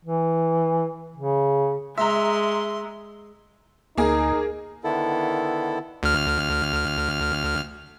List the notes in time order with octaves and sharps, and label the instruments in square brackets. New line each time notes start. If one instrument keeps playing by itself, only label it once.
[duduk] E3
C#3
[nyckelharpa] G#3 [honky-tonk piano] E5 A#5 [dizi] C6
[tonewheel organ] D2 [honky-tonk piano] A#3 G#4 [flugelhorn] D#4
[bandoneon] D3 D#3 B3 E4 A4
[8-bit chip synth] D2 F6